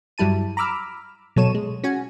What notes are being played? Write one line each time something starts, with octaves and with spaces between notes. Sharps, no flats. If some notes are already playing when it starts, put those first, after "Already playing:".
G2 F#3 G3 E4 A5 D#7
A#5 B5 D6 E6 F6
B2 F#3 A4 C#5 D#7 E7
G#3
C#4 F#4 G#5